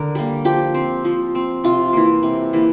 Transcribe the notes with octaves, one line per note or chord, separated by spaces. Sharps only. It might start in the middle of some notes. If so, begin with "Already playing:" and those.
Already playing: D3 A#4
G3 A#3
F3 G4
C4
F3
C4
C3 F4
E3 A#3
C3
E3 A#3